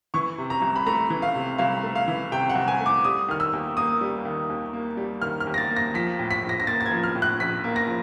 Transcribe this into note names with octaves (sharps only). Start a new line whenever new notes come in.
E3 C#6
C3
A#5
C2
B5
A3 A#5
E3
F5
C3
C2 F5
A3
F5
E3
C3 G5
F#5
C2
G#5
A3
D6
G3 D#6
D#3 F6
E6
D#2
A#3 D#6
G3
D#3
D#2
A#3
G3
D#3 F6
F6
D#2
A#6
A6
A#3
A#6
F3 B6
A2
B6
A#1
A#6
A#6
A#3 A6
A6
G#6
F3
F6
A2
F#6
A#1 B6
A#3
A#6
F3